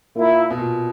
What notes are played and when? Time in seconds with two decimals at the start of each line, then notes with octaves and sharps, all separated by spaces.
0.14 A#2 A#3 E4
0.50 B2
0.58 A#2